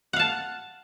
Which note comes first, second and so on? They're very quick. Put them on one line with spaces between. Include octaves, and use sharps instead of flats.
F#5 F5 A5